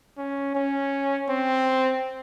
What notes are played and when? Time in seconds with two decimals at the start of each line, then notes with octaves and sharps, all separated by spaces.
0.17 C#4
0.55 C#4
1.29 C4